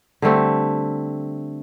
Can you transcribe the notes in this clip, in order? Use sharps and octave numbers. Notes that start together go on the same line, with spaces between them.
D3 G3 A3 C4